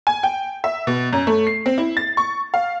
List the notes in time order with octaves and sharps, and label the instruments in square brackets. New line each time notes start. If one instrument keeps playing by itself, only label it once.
[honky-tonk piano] G#5
G5
E5
B2
F#2
A3
C7
C4
E4
A6
C#6
F5